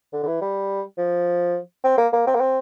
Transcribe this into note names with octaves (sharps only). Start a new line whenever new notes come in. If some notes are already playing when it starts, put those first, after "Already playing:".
D3
D3
E3
G3
F3
C4
A#3
A#3
C4
A#3
C4